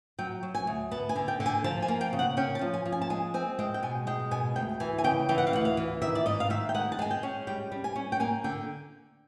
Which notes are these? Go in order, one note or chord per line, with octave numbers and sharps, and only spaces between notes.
F#3 G5
F#3
G#5
D2
B3 A5
G#5
D3
G5
D3
G#5
F3 A5
G#5
A#3
G5
C#3
F#5
C#4 G5
A5
F3
G#5
F3
G#5
A5
G#3 G#5
C4 G#5
G#3 G5
G5
B2 G#5
G#3 G5
B2 G#5
D2 G5
E3 G#5
G#5
C#3 G5
E3 G5
F#5
F5
D2 F#5
F5
E3
D#3 E5
D5
G#2 D#5
F5
D#3 E5
G5
G#3 F#5
A5
G#3 G#5
G5
C#4
G3 G5
G3
G#5
C#4
G5
A#3 G#5
D3 G5